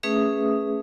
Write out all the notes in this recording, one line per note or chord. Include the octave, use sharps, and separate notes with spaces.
A3 C#4 G#4 B4 E5 D#6